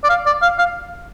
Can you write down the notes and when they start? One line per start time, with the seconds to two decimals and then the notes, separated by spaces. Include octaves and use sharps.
0.04 D5
0.10 F5
0.26 D5
0.42 F5
0.59 F5